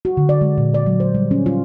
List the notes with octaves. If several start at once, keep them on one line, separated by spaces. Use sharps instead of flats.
F#4
D3
D5
G#3
A#2
D5
F#3
C5
G3
C#4
F4